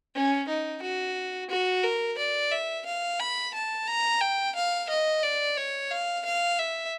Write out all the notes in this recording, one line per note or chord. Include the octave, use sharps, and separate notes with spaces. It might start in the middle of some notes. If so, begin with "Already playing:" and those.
C#4
D#4
F#4
F#4
A#4
D5
E5
F5
B5
A5
A#5
G5
F5
D#5
D5
C#5
F5
F5
E5